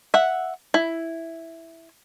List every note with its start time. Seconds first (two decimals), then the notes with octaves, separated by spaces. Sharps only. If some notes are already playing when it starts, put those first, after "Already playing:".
0.14 E5 F#5
0.74 E4